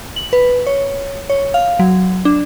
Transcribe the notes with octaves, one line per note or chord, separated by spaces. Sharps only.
F#7
B4
C#5
C#5
F5
F#3
D4